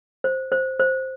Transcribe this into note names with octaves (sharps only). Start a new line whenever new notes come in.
C5
C5
C5